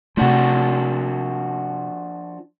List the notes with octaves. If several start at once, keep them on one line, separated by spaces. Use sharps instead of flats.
C3 F3 A3 D4 F#4